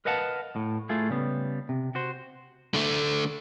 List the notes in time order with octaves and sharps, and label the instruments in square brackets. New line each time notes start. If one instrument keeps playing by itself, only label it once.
[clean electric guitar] A#4 B4 D#5 F5 F#5 A5
A2
A2 A3 F4 G#4
C#3 G3 B3
C3
F#4 C5
[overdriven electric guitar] D3 A3